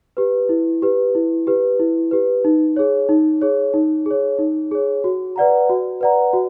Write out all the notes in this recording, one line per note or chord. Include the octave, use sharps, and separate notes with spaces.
G4 B4
E4
G4 B4
E4
G4 B4
E4
G4 B4
D#4
G#4 C#5
D#4
G#4 C#5
D#4
G#4 C#5
D#4
G#4 C#5
F#4
B4 D5 F#5 A#5
F#4
B4 D5 F#5 A#5
F#4